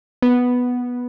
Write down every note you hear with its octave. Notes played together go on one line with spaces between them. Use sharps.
B3